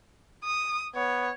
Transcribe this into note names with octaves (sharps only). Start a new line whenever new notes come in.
D#6
B3 C#5